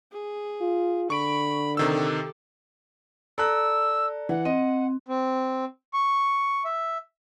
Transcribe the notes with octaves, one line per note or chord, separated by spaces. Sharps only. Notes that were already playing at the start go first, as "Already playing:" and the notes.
G#4
F4
D3 B5 C#6 D7
C3 D#3 G4 A4 E6
A4 D5 A#5 E6 F#6
E3 F#5
C4 D#5
C4
C#6
E5